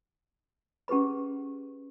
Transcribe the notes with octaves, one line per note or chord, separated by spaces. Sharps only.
C#4 G4 G#4 B4 B5